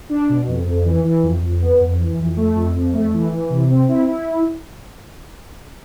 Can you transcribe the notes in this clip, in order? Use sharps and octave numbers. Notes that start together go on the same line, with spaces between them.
D4
B2
F2
F2
E3
E3
F2
F2
B3
F2
E3
F2
A3
F2
F2
A3
E3
E3
C3
C4
E4
E4